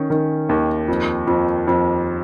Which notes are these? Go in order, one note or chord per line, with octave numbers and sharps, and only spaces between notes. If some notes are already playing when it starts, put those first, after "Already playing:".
Already playing: D#3 C#4
D#3
D#2
F2
F2
F2